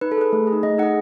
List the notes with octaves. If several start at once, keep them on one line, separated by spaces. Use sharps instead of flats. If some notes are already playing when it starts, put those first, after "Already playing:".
D#4 B4
A4
G#4 B4
A3
G#4
D#4
A3 D#5
D#4 G#4 F#5